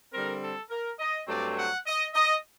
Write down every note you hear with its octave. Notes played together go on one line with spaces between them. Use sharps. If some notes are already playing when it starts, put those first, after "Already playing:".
D3 G3 C4 A#4
A4
A#4
D#5
G2 F#3 A3 C4 D5
F#5
D#5
D#5